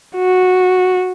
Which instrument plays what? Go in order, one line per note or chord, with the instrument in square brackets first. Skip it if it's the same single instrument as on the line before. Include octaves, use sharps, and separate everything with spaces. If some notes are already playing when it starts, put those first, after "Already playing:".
[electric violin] F#4